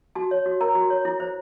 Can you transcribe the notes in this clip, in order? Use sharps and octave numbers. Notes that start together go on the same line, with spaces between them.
F#4 A5
C#5
F#4
A#4 A#5
F#4
C#5
E4
C5